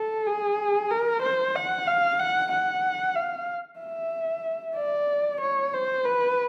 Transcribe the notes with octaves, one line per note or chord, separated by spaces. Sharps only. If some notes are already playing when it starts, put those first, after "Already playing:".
Already playing: A4
G#4
A#4
C5
F#5
F5
F#5
F#5
F5
E5
D5
C#5
C5
B4